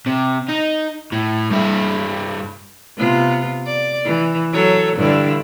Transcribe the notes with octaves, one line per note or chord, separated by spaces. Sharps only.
C3
D#4
A2
G2 E4
C3 B3 F4
D5
E3
F#3 A4 C#5
G2 D3 E4